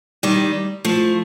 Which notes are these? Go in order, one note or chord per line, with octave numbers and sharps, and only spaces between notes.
D#3 G3
F3 A3